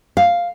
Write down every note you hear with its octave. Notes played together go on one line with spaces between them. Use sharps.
F5